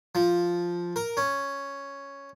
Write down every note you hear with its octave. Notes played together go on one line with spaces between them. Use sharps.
F3
A#4
C#4